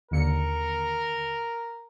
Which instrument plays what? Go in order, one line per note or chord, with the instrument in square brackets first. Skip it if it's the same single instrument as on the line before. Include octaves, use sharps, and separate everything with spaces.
[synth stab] D#2 D3 C#7 [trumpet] A#4